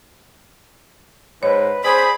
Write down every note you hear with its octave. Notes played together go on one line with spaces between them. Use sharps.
G#2 B4 C#5
G#4 C5 D5 B5